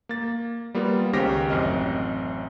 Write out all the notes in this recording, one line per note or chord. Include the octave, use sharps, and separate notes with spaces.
A#3 A6
G3 A#3 B3 F4 A#4
C#2 D#3 C#4 G4 C5 A#6
A1 F#2 C4 D#5 F6